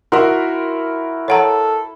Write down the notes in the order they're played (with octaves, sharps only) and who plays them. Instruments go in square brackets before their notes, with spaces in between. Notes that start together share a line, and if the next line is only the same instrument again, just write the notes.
[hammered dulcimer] E4 E5 [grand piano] F#4 A#4 C6
[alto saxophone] A4 [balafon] C#5 F#5 A#5